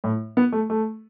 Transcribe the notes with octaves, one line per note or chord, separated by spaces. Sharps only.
A2
B3
A3
A3